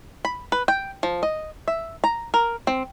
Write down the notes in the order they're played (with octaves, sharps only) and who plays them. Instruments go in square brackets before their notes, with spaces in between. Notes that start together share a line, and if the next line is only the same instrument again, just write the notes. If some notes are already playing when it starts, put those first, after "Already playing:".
[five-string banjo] B5
B4
G5
F3
D#5
E5
A#5
A#4
C4